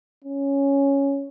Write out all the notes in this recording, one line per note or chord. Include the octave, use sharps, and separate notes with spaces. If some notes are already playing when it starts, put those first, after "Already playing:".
C#4